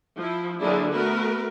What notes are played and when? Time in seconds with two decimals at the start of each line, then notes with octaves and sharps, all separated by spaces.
0.18 F3 E4
0.59 D3 F#3 A#3 D4 E4 G#4
0.92 A3 B3 F#4 A#4 B4